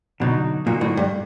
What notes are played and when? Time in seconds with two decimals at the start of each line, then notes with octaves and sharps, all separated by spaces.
0.20 B2 D3 F#3 A#3 D#4 F#4
0.66 A#2 D3 F#3 A#3 D#4 F#4
0.81 A2
0.97 G2